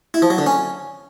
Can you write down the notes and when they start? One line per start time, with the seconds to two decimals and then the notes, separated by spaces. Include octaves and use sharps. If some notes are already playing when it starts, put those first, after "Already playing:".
0.14 E4
0.22 F3
0.30 F#3
0.38 D3
0.46 C#4